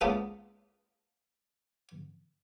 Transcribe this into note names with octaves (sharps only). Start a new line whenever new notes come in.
G#3 A#3 B3 C#4 F4 A4